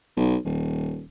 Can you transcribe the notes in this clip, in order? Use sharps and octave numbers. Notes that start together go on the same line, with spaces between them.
B1
D#1